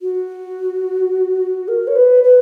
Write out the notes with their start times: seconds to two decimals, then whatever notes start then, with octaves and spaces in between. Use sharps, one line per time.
0.02 F#4
1.68 A#4
1.87 C#5
1.96 B4
2.24 B4